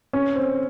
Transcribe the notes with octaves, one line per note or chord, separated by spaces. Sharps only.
C#4
C4